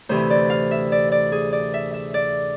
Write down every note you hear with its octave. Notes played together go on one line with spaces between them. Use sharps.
D2 C3 E3 C5
D5
F5
E5
D5
D5
G#4
D5
E5
E5
D5